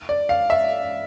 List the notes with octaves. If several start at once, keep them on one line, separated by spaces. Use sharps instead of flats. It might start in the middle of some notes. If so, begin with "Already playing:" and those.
D5
F5
E5